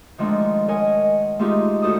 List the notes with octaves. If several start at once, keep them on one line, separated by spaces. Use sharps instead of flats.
D#3 F3 G#3 A3 D4
A#4 C#5 D#5 F#5 G#5
G#3 A3 D#4 F4 G4 G#4
D2 F#4 A4 C5 D#6